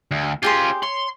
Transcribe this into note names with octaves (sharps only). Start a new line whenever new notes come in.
D2
C#4 F4 G4 G#4 C6
C#5 C6